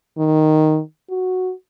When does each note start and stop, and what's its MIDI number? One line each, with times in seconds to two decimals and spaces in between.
0.18 0.80 51
1.10 1.52 66